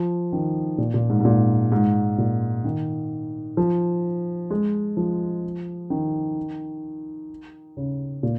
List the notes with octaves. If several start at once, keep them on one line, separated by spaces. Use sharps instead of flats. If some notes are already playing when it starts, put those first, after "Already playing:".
Already playing: F3
D#3
A#2
A#2
G#2
G#2
A#2
G#2
A#2
D#3
F3
G#3
F3
D#3
C#3
A#2